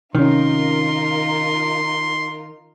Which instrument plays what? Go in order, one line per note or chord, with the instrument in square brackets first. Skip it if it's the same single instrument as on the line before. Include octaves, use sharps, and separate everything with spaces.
[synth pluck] C3 C#4 [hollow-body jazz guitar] D#3 [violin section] D#4 F4 A#4 [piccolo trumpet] C6